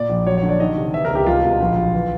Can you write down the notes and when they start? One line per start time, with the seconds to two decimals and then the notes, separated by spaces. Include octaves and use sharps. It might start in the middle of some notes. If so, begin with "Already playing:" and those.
Already playing: A#2 D5
0.09 A#1
0.26 F#3 C#5
0.38 C#5
0.43 D3
0.49 D5
0.60 D#3 D#5
0.76 C3
0.93 E3 E5
1.05 A#4
1.10 C#2
1.15 G4
1.26 C2 F4
1.44 B2
1.60 A#1
1.78 F#3
1.94 E3